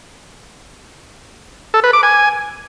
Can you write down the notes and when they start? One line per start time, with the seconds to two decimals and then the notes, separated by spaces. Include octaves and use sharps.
1.74 A4
1.84 B4
1.93 D6
2.03 G#5